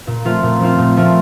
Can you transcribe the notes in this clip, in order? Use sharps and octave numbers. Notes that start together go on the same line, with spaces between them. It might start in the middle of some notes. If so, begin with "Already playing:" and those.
A#2
F3 A3 C4 F4
A#2
F3 A3 C4 F4
A#2
F3 A3 C4 F4